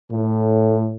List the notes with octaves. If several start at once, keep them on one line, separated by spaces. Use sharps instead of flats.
A2